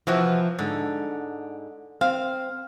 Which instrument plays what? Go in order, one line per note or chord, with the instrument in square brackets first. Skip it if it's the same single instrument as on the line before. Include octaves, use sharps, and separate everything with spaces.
[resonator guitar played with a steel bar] C3 E3 F#4 [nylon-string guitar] F3
[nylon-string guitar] G#2 [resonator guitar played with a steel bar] D3
[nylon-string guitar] C4 [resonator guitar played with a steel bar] F5